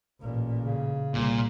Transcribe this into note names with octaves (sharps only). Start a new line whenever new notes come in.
A1 A#2
C#3
C2 A#2